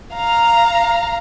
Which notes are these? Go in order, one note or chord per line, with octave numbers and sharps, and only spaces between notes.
F5 A#5